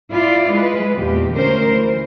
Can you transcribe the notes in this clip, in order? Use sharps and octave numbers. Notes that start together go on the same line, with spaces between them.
E4 F4 D5
G#3 B4
E2 A#2 G4
D2 C#4 A#4 C5
E3